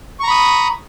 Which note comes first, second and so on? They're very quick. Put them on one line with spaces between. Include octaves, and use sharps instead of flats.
C#6 A#5 B5 D#6